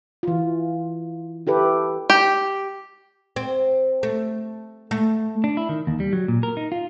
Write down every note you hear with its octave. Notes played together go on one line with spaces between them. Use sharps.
E3 F4
E4 G4 A4 B4
G4
C4
A3
A3
D4
E4
D#3
D#2
G3
F#3
A#2
A#4
D#4
F4